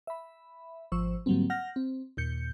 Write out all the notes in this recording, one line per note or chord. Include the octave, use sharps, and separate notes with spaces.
E5 B5
G#1 F3 C5 C#6 E6
G#2 D3 F#3 G3 A#3 C4
F#5 F6 G6 A#6
C4
D#2 A#2 G6 C#7